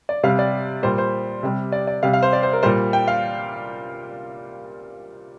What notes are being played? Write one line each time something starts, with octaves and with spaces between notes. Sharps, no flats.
D5
C3 G3 F5
D5
A#2 G3 C5
C5
C3 G3
D5
D5
C3 G3 F5
F5
C5
D5
C5
A#4
A#2 G3 C5
G5
F5